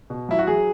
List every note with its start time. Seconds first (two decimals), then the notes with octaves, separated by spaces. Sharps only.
0.10 B2
0.29 F#3 E4
0.39 F#4
0.47 F#3 G#4